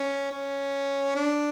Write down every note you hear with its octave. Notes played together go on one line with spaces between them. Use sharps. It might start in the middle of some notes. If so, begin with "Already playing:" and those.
Already playing: C#4
C#4
D4